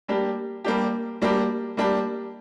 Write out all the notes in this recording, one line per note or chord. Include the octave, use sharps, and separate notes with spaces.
G3 A#3 D4 G4
G3 A#3 D4 G4
G3 A#3 D4 G4
G3 A#3 D4 G4